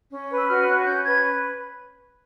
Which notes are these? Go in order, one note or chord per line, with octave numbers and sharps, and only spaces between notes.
C#4
B4
E6
F#4 F6
C#4 F#6
C#4 G6
B4 G#6